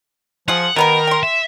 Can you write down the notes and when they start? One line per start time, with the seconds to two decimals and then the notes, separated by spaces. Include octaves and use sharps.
0.48 F3 F4 G#4 F#5
0.76 B2 D#3 B3 A#4 A#5
1.07 G5 C6
1.23 E5